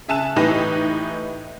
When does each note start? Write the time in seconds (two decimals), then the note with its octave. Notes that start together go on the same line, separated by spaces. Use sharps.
0.08 C#3 E5 G#5 A5 F#6 E7
0.36 A2 E3 D#4 G4 B4 A#6